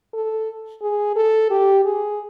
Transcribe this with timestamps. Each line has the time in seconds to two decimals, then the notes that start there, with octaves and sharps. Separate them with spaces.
0.13 A4
0.82 G#4
1.16 A4
1.51 G4
1.85 G#4